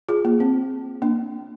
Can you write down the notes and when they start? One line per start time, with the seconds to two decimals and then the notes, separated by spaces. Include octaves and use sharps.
0.09 F4 G#4
0.25 A#3
0.40 C4
1.02 A#3 D4